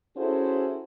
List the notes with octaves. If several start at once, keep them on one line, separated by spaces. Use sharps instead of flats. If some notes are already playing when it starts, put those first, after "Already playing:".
C#4 E4 F#4 G#4 A4 C5